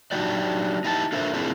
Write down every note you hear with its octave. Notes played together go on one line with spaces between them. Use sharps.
F#3 D4 D#4 F#4 G4 D5
D#4 E4 G4 A5
D4 F4 A4 A#4 C5 E5
C4 D4 E4 F4 G#4 A#4